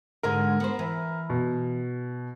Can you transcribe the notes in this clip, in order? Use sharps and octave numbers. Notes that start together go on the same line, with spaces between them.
G#2 D3 G#3 A#4
B3 C5
E3
B2